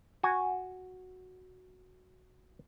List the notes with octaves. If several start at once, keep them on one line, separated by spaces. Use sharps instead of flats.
F#4 G#5